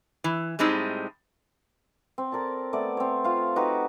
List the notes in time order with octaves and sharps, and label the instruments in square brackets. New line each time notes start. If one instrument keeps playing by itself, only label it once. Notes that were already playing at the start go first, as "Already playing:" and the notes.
[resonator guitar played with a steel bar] E3
A2 G3 G#3 C4 D#4
[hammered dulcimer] C4
A4 A#4 D5 A5
A3 B3 A4 D5
C4 C#5
F4 F5
D#4 F#4 G4 B4